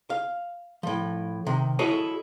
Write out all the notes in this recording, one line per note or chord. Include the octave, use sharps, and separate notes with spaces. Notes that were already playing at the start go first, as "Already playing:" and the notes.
F5
A2 F3
C3 D#3
E4 F#4 G#4 A4 C#5 D#5